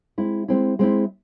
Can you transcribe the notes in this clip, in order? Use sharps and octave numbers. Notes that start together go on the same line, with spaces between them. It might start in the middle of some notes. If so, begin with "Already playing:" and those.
G#3 C4 E4
G#3 C4 E4
G#3 C4 E4